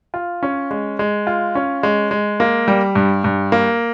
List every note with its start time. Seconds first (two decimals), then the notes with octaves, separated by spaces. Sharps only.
0.14 F4
0.43 C#4
0.71 G#3
0.99 G#3
1.27 F4
1.55 C#4
1.83 G#3
2.11 G#3
2.40 A#3
2.68 G3
2.95 G2
3.24 G2
3.52 A#3